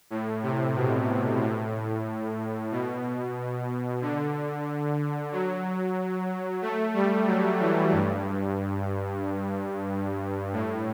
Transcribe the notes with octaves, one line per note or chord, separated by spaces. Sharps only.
A2
C3
B2
A2
B2
D3
F#3
A3
G3
F#3
E3
G2
A2